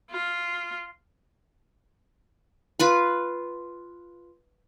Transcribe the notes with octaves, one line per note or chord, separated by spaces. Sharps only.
F4
F4 B4 B5